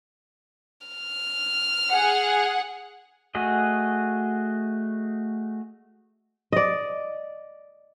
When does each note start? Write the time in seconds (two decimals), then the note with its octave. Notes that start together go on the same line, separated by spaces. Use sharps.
0.87 F6
1.91 G#4 F#5
3.35 A3 F#4 G#4 D#5
6.52 D5 D#5